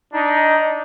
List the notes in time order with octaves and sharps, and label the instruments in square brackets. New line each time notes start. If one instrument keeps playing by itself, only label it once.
[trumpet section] D4 D#4